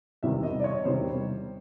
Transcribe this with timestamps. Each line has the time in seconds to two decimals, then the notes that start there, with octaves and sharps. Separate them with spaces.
0.23 E1 E2 C3 D#3 G3 E5
0.43 D#5
0.60 D5
0.64 C#5
0.85 E1 E2 C3 D#3 G3 C5